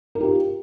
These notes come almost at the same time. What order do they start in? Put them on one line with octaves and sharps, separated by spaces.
A#4 D#4 G4 F4